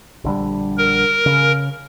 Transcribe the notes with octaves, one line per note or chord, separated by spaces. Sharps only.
A#1 D3 G3
A#4
C#3